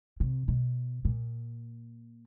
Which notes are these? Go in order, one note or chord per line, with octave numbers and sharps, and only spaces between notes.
C3
B2
A#2